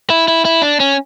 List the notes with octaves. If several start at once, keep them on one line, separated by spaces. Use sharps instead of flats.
E4
E4
E4
D4
C#4